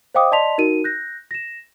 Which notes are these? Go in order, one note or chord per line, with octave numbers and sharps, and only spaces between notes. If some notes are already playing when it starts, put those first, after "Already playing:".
C5 D#5 F5 G5 D6 D#6
D5 D#5 A5 C6 B6 F7
D#4 F#4 A#4 D#7
F#6 G6 A#6
A#6 E7